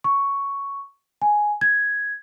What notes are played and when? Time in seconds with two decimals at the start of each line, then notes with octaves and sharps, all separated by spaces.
0.04 C#6
1.22 G#5
1.61 G#6